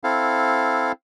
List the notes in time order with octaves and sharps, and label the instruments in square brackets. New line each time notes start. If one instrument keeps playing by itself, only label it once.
[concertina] C4 E4 A4 F5